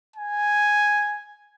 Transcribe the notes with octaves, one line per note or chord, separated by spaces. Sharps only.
G#5